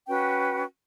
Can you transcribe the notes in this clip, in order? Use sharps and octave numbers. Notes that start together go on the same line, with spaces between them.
C#4 F#4 B4 G5